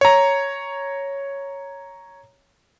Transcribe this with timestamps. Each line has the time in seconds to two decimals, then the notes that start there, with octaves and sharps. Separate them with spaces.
0.01 C#5 A#5